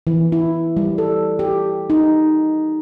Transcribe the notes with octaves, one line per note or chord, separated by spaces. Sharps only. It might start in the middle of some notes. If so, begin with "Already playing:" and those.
E3
E4
G3
A4
G4
D#4